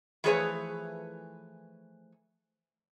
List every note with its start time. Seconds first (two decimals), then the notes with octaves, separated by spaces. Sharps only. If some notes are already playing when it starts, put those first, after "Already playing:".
0.24 E3 F3 A3 G#4 B4 C#5